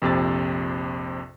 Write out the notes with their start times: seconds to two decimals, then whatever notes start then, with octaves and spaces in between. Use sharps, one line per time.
0.02 A#1 F2 C3 C4 A6